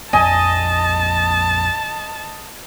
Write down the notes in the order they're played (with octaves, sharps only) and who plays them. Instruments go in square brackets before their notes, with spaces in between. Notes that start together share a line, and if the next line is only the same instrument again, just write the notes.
[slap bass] A#1 F2 A#3 [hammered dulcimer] D#5 [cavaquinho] G#5 [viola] A5